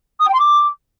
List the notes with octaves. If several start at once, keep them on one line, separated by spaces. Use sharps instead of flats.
D#6
G5
C6
D6